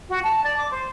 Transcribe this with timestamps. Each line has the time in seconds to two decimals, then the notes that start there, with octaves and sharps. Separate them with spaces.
0.09 F#4
0.24 A5
0.44 D5
0.57 D6
0.71 C5